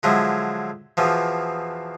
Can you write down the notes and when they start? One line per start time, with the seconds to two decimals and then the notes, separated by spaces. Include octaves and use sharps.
0.03 D3 F3 F#3 G#3 E4
0.97 E2 B2 E3 F3